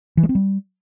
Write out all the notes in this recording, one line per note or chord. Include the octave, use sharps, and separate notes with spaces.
E3
G#3
C4
G3